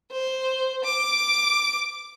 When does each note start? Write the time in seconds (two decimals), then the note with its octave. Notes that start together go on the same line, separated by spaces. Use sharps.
0.12 C5
0.84 D6